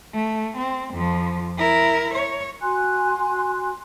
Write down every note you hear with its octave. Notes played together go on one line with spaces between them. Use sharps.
A3
C4
F2 F3
E4 A#4
C#5
F#4 G#5 C6 F#6